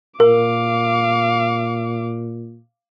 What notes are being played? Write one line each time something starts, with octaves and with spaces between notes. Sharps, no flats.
A#2 A#4 F5 D6